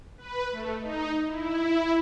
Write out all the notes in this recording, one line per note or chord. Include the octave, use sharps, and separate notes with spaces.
B4
A3
D#4
E4